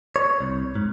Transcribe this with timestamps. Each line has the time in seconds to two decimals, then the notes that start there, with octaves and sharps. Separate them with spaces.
0.16 C#5
0.41 C2
0.75 G#2